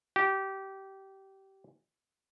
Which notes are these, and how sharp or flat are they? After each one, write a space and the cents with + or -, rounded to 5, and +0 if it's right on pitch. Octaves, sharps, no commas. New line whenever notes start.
G4 -20